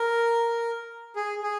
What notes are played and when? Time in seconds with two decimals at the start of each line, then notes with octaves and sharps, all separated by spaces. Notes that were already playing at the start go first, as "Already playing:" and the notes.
Already playing: A#4
1.16 G#4
1.43 G#4